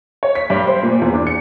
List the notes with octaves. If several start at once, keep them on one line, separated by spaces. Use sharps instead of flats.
C#5
B6
G2
C5
A#2
E2
D4
C#7